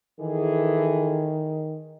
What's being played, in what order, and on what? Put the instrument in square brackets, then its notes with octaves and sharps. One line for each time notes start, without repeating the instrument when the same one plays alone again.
[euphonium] D#3 [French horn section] E3 G#4 A4